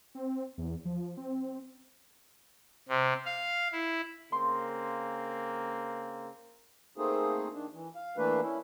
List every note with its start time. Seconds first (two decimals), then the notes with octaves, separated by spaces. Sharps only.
0.15 C4
0.58 E2
0.85 F3
1.17 C4
2.89 C3
3.25 F5
3.72 E4
4.32 C#3 A#3 C4 C6
6.97 A3 A#3 C4 D#4 G#4
7.53 D#3 D4
7.73 E3
7.95 F5
8.17 E3 A3 A#3 D4 B4
8.42 C#4 E4